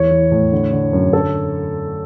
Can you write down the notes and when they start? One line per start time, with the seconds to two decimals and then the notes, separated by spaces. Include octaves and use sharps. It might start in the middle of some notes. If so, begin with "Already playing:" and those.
Already playing: E2 E3 C#5
0.11 E3
0.32 A2
0.52 D3
0.72 D3
0.93 F#2
1.13 D3 A4